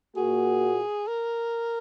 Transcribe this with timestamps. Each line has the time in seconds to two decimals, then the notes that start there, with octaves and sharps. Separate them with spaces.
0.16 A#2 A#3 F#4 G#4
1.07 A#4